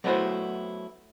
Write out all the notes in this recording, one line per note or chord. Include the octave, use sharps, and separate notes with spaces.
F#3 A3 B3 E4 F#4 C5